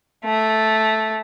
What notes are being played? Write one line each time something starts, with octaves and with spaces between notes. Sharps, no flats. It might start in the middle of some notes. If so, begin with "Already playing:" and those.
A3